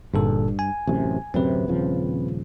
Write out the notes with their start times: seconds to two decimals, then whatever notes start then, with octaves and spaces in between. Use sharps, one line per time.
0.14 G1 G2 A#2 A4
0.59 G#5
0.87 A1 F#2 C3
1.34 D1 F#2 C3 C4 B4
1.68 D#1 C#3 F3